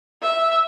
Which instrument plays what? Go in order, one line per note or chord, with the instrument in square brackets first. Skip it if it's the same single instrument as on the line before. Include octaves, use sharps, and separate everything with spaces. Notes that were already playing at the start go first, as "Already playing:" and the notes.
[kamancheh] E5